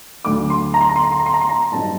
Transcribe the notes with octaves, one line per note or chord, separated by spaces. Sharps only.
D2 D3 F#3 A3 D6
C6
A#5
C6
A#5
C6
A#5
C6
A#5
C6
A#5
C6
A#5
G2 F#3 C4 D#4 A5